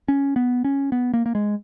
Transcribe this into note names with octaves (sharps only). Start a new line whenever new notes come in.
C#4
B3
C#4
B3
A#3
A#3
G#3